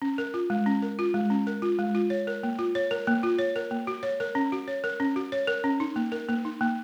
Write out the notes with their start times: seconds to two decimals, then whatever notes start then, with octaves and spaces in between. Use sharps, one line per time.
0.02 C#4
0.18 A#4
0.34 F4
0.50 G#3
0.66 C#4
0.82 A#4
0.99 F4
1.14 G#3
1.30 C#4
1.47 A#4
1.62 F4
1.79 G#3
1.95 F4
2.10 C#5
2.27 A#4
2.43 A#3
2.59 F4
2.75 C#5
2.91 A#4
3.07 A#3
3.23 F4
3.39 C#5
3.56 A#4
3.71 A#3
3.87 F#4
4.03 C#5
4.20 A#4
4.35 C#4
4.52 F#4
4.68 C#5
4.84 A#4
5.00 C#4
5.16 F#4
5.32 C#5
5.47 A#4
5.64 C#4
5.80 D#4
5.96 A#3
6.12 A#4
6.29 A#3
6.45 D#4
6.61 A#3